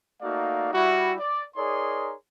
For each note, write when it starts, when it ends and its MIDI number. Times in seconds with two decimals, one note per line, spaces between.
0.22 0.72 57
0.22 0.72 58
0.22 0.72 63
0.22 0.72 66
0.22 0.72 74
0.22 0.72 77
0.73 1.14 55
0.73 1.14 64
0.73 1.14 66
1.20 1.44 74
1.56 2.14 63
1.56 2.14 68
1.56 2.14 70
1.56 2.14 73
1.56 2.14 74
1.56 2.14 84